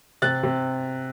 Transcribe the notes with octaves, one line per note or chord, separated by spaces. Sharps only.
C3 F#6 A6
C3